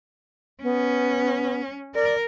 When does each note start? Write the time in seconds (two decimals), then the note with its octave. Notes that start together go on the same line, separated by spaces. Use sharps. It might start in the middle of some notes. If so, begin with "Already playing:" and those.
0.63 B3 C#4
1.95 A#4 D5